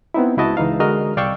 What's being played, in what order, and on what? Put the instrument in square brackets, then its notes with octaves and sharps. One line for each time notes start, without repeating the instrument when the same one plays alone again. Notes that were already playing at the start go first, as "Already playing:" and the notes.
[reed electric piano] B3 C4 D#4 E4
C#2 E4 F#4 D#5 A5
C#2 E3 D#4 F5
D3 G#3 F#4 A#4 D#5 F6
C2 D5 F5 G5 C#6 E6